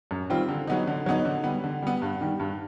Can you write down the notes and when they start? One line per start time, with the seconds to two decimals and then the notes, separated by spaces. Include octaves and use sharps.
0.11 F#2
0.30 D#3 G3 C4 F4
0.48 D3
0.67 F#3 B3 D#4
0.87 D3
1.06 F#3 B3 D#4
1.25 D3
1.44 G3 B3
1.64 D3
1.83 G3 B3
2.02 G2
2.21 D#3 G3
2.40 G2